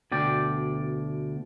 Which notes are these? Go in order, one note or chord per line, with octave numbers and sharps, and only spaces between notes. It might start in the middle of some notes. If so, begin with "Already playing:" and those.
D2 B2 D5 G5